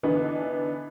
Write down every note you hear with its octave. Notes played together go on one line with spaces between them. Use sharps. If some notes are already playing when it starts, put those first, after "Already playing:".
D3 E3 B3 D4 D#4